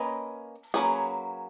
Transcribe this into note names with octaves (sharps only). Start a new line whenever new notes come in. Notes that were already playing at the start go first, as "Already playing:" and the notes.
Already playing: A#3 C#4 B4 D#5
F#3 A#3 C#4 G#4 B4